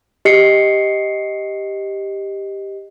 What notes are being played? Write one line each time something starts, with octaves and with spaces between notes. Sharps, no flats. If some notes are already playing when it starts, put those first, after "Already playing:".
G4 D#5 C7 C#7